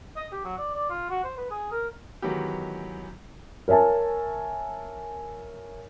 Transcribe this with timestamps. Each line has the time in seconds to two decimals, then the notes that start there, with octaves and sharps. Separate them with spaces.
0.16 D#5
0.32 G4
0.45 F#3
0.58 D5
0.75 D5
0.90 F4
1.10 F#4
1.24 C5
1.38 B4
1.51 G#4
1.72 A#4
2.22 D#3 E3 F#3 G#3 B3 G4
3.68 A#4 C#5 E5 G#5 A5